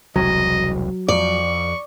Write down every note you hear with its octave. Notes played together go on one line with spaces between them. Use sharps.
E1 C2 F#3 D#5
F2 D5 C#6